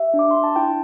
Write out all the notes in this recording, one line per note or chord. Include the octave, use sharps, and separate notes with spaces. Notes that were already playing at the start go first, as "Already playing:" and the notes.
Already playing: G4 E5
D4
D6
D4 C6
A5
E4 G5